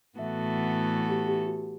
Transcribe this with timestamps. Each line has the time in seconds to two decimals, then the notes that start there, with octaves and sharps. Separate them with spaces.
0.18 A2 E3 B3 F#4 A4 E5
1.10 G4
1.28 G4
1.47 F#4